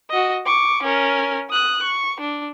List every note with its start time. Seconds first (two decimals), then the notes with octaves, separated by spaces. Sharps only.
0.10 F#4 D#5
0.46 C#6 D6
0.83 C#4 A#4
1.50 D#6 F#6
1.83 C#6
2.20 D4